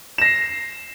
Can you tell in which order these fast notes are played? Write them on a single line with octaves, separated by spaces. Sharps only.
E7 A#6 C7